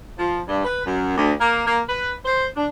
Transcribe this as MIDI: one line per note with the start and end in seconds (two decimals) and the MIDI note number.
0.19 0.41 53
0.48 0.62 43
0.65 0.81 71
0.86 1.16 42
1.17 1.33 38
1.41 1.67 58
1.67 1.81 58
1.89 2.12 71
2.25 2.46 72
2.57 2.67 62